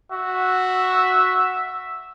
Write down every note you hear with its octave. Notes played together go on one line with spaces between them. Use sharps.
F#4 E5